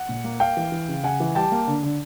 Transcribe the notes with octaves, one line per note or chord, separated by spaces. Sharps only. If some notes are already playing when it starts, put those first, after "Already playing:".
Already playing: F#5
A#2
A#3
A#3 F5 G5
E3
E3
C#3
C#3 F#5 G#5
E3
G3 G5 A5
A#3
D3
D3